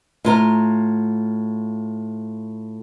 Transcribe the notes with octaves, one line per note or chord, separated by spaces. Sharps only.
A2 F4 A#5